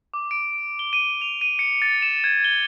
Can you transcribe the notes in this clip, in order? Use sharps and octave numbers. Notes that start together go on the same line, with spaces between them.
D6
D7
G7
D#7
F7
D#7
C#7
A6
E7
G#6
G7